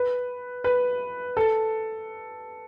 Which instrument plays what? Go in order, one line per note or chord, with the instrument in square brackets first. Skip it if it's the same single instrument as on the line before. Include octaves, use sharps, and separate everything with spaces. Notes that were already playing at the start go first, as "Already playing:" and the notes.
Already playing: [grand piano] B4
B4
A4